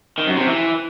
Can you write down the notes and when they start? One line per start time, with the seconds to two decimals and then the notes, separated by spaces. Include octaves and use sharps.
0.18 D#3
0.27 F#2
0.37 C3
0.46 E3